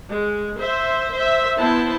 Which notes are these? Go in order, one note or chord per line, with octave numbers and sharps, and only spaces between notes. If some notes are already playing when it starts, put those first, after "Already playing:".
G#3
C5 E5
C5 E5
B3 E4 C5 A5